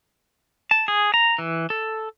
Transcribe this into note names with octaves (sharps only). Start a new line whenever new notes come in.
A5
G#4
A#5
E3
A4